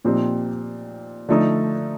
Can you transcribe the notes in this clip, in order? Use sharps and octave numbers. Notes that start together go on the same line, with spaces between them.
A#2 F3 C4 D#4 G4
D3 F3 A3 D#4